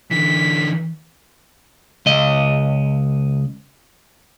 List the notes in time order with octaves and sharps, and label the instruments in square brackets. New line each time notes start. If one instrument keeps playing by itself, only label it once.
[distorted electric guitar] D3 E3 [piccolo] B6
[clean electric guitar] C#2 D#5